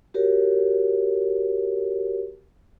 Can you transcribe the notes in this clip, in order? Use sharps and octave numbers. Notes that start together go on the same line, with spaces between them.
F#4 G4 A#4 C#5